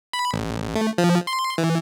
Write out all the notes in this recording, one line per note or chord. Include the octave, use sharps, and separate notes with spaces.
B5
A1
A3
F3
C6
E3